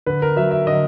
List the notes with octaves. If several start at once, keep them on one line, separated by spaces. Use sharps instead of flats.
D3 B4
A#4
F#3 E5
E5
D3 D#5